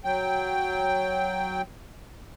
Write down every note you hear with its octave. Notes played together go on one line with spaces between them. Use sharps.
F#3 G5